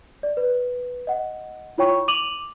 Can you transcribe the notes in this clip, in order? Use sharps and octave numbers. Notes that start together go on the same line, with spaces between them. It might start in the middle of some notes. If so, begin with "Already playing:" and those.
D5
B4
D#5 F#5
E4 F4 C#5 G5 C#6
D6 D#7 F7 F#7